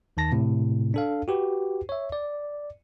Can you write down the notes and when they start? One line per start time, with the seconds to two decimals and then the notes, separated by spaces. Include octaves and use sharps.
0.17 D#2 D#3 A5 A#6
0.32 A2 C3
0.94 D4 A4 F5
1.28 F#4 G4 B4
1.89 C#5 E5
2.12 D5